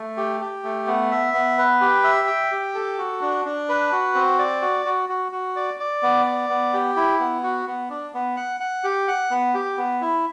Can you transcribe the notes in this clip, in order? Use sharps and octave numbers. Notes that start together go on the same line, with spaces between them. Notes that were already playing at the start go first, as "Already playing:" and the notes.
Already playing: A3
G4
G4
A3
B3
E5
B3
B4
G4
E5
G5
G4
A4
F#4
D4
D4
B4
F#4
C4
D5
F#4
F#4
F#4
F#4
D5
D5
B3
D5
B3
G4
E4
B3
F#4
B3
D4
B3
F#5
F#5
G4
F#5
B3
G4
B3
E4